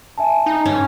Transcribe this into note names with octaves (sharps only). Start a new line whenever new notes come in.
E5 G#5 A5
D#4
G2 C#4